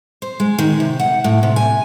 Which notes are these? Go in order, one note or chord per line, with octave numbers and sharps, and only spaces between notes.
C5
G#3
D#3
C3
F#5
A2
C3
G#5